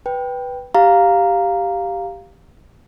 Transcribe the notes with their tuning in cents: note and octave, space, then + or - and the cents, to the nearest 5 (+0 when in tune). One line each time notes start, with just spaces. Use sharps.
B4 +0 G5 +0
G4 +0 F5 +0 A#5 +0